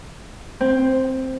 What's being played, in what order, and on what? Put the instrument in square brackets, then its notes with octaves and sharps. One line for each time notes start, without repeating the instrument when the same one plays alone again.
[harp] C4